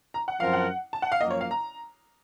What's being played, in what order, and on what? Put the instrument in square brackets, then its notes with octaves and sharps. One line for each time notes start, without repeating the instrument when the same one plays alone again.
[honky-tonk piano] A#5
F#5
[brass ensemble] F#2 F3 C4 F4 A#4 [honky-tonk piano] F5
[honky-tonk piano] F#5
A5
F#5
F5
[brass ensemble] F#2 F3 A#3 [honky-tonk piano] D#5
[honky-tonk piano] C#5
F5
A#5